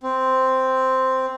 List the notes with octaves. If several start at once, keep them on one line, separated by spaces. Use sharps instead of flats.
C4